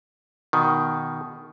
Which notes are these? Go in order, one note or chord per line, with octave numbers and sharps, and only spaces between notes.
B2 D#3